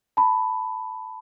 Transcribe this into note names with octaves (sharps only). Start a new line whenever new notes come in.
A5 B5